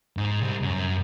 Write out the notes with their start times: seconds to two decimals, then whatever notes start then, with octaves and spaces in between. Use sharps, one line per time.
0.17 G#2
0.42 C2
0.62 F#2